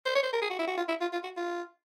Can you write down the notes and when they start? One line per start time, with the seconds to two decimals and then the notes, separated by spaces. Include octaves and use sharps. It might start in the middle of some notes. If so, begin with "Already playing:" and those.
0.06 C5
0.15 C#5
0.23 C5
0.33 A#4
0.42 G#4
0.50 F#4
0.59 E4
0.68 F#4
0.77 F4
0.89 E4
1.01 F4
1.13 F4
1.24 F#4
1.37 F4